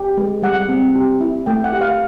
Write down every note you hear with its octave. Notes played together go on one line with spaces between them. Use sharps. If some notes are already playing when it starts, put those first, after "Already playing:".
Already playing: G4
G#3
G3 F#5
C4
G4
E4
A3 G5
F#5
G4
F5